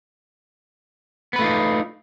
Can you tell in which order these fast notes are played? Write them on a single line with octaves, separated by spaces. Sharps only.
B3 B4 A3 F4 D#4